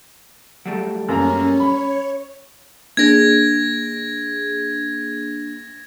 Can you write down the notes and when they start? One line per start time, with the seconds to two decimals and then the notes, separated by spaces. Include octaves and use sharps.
0.65 F#3 G3 A3
1.09 F#2 A#3 C#4 A#5
1.60 C#5 B5
2.97 A#3 D4 G#4 G#6 A#6